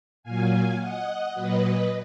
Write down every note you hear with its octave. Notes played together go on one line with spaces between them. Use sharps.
A#2 F#3 F5 G#5
D#5 F#5
A#2 F#3 B4 D#5